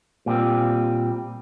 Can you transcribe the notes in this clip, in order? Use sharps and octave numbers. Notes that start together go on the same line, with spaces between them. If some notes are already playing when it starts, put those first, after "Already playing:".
A#2 G3 C4